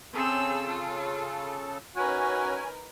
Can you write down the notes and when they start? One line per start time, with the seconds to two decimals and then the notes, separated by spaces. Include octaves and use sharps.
0.14 C#3 C4 G#4 A4 E6
0.67 F4
1.96 C#4 D#4 F#4 A#4 B4 G#5